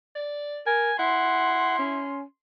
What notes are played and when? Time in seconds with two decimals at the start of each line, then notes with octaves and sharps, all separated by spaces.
0.15 D5
0.66 A#4 G#5
0.99 E4 F#5 C6
1.79 C#4